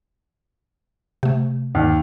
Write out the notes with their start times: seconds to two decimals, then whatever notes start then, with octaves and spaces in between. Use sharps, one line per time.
1.23 C3 A3
1.75 D#2